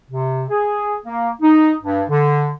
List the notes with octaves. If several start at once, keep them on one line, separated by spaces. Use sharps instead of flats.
C3
G#4
A#3
D#4
G2
D3